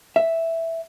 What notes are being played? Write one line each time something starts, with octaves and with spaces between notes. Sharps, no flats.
E5